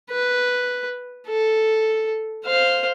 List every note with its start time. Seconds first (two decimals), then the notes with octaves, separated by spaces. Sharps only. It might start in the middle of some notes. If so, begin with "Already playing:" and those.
0.11 B4
1.28 A4
2.45 C5 F5